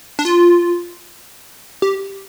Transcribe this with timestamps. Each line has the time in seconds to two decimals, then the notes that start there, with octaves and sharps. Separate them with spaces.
0.19 D4
0.25 F4
1.82 G4